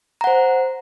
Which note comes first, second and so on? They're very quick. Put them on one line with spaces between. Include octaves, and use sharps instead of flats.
A#5 F#5 C5